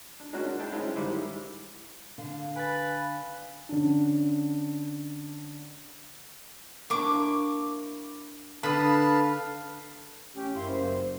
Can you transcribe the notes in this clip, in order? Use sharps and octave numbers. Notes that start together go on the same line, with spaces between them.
D4
G#3 A#3 C#4 D4 F#4 G#4
D4
E4 G#4 G5 A5
G#3 C4 C#4 E4 F4
G#2 D#3 G3 E4 C5 D6
D3 F5
B4 G#5 A6
D3 C#4 D4
A#3 D4 E4 C#6 D6
D3 B4 F5 A5 B5 D#6
A1 C#4 G4
F#2 E4 F5 C6
F#1 C5